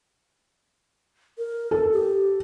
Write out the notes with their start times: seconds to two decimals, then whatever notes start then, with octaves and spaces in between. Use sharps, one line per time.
1.38 A#4
1.71 A4
1.93 G4